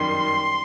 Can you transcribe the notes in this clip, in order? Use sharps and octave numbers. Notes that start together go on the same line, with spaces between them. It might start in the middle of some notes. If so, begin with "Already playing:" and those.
Already playing: F#2 D#3 G3 C6